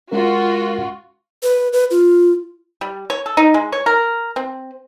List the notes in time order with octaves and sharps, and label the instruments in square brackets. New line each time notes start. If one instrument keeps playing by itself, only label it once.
[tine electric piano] G#3 C#4 A#4 [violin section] F4 F#4
[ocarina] B4
B4
F4
[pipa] G3
C#5
A4
D#4
G#3
C#5
A#4
C4